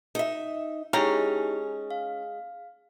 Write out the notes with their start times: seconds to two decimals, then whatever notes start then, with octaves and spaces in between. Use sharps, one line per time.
0.15 D#4 E5
0.93 G#3 C#4 D#4 E4 G4 G5 A#5
1.91 F5